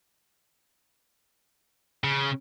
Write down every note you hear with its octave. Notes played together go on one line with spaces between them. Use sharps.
C#3